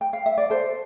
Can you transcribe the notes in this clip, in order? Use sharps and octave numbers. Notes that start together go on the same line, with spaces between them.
G5
F5
E5
D5
A4 C5